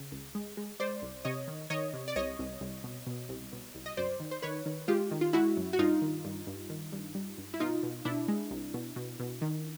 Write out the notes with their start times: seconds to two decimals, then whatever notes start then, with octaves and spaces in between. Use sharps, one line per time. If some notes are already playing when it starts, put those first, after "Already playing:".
Already playing: C#3
0.12 C#2
0.35 G#3
0.57 G#3
0.80 G#3 C5 D5
1.02 C2
1.25 C3 C#5 D#5
1.48 D#3
1.70 D#3 C#5 D#5
1.93 C3
2.08 D5
2.16 C2 C#5 D#5
2.39 C2
2.61 C2
2.84 B2
3.07 B2
3.29 C2
3.53 B2
3.75 C2
3.86 D#5
3.97 F#2 C5 D5
4.20 D#3
4.31 C5
4.42 D#3 B4 C#5
4.66 D#3
4.88 G#3 F4 G4
5.11 D#3
5.21 F4
5.33 G#3 E4 F#4
5.57 F#2
5.73 F#4
5.79 G2 D#4 F4
6.02 D#3
6.25 G2
6.47 G2
6.70 D#3
6.92 G2
7.15 G3
7.38 G2
7.54 E4
7.60 B2 D#4 F4
7.83 B2
8.05 B2 D4 E4
8.28 G#3
8.51 C2
8.74 B2
8.96 B2
9.20 B2
9.41 D#3